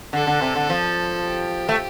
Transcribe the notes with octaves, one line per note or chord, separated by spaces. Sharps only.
D3 A4
D3
C3
D3
F3
G4
A3